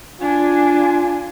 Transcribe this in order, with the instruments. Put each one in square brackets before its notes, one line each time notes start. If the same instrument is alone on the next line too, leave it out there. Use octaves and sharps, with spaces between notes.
[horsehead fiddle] D4 [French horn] F4 [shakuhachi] G#5